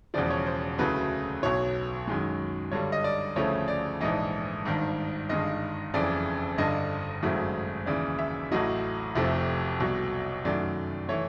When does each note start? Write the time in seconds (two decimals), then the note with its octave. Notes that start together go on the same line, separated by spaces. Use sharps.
0.14 E1 E2 C#3 F3 D5
0.30 C#5
0.46 C5
0.78 D2 C#3 F#3 A3 B4
1.43 B1 B2 F#3 C#5
2.07 F#2 D#3 G#3
2.72 G1 G2 D3 G3 C#5
2.92 D#5
3.04 D5
3.36 D2 C#3 F3 A3 C#5
3.68 D5
4.00 A#1 G#2 E3 D#5
4.65 G#1 G2 D#3
5.29 G1 G2 D#3 G#3 D#5
5.94 F#1 F2 C#3 E3 D5
6.58 G1 G2 D3 D#5
7.23 G#1 F#2 C#3 F#3 A3
7.86 D#2 C#3 E3 D5
8.19 E5
8.51 A1 A2 F#3 D#5
9.15 F1 F2 C3 F3 A3
9.80 C2 B2 F#3
10.45 F#2 D#3 F#3 A3 D5
11.09 E3 A3 C#5